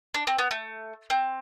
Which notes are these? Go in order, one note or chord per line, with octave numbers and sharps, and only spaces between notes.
D4
C4
B3
A3
C4